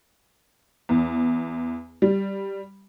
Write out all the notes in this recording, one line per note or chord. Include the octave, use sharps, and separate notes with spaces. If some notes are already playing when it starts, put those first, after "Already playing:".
E2
G3